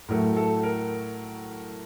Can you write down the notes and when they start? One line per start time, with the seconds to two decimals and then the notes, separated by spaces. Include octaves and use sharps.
0.08 A2 F#3 A3 A#4
0.37 A4
0.63 A#4